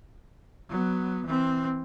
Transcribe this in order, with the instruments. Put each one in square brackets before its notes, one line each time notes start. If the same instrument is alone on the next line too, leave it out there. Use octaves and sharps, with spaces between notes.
[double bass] F#3 B3
E3 C4